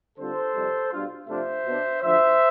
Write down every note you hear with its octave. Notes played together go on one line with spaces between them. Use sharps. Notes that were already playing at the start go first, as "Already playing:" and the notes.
D3 G3 C4 F4 A4 C5
F2 C3 G3
B2 G3 D4 F4
C3 F3 A3 D4 F4 C5 E5
B2 B3 D4
D2 D3 F3 C5 E5